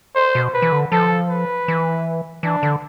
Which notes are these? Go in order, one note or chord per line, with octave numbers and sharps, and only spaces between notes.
C5
B2
B4
E3
D3
F3 A4
B4
E3
E3 D4
D3